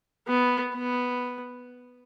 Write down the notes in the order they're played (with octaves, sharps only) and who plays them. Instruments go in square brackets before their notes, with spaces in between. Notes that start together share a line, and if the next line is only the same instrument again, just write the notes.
[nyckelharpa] B3
B3